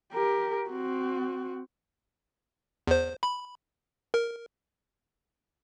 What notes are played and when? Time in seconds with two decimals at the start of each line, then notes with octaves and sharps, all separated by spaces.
0.12 G4 A#4
0.69 C4 F#4
2.87 E2 C5
3.23 B5
4.14 A#4